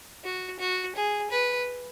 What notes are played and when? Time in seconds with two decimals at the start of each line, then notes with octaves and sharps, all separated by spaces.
0.24 F#4
0.59 F#4
0.95 G#4
1.31 B4